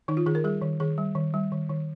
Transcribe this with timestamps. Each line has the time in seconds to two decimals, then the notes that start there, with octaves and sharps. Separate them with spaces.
0.08 D#3 D#4
0.17 F4
0.26 D#3 G#4
0.35 A#4
0.44 G3 G#4
0.62 D#3
0.80 D#3 G#4
0.98 G3
1.15 D#3
1.34 G3
1.52 D#3
1.70 D#3